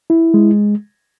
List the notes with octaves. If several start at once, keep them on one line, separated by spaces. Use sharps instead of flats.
E4
G#3